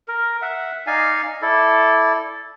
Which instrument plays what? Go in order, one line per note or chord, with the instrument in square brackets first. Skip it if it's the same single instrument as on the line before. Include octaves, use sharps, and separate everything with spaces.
[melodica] A#4
E5 F#5
D#4 D5 F5 G#5
E4 A4 D5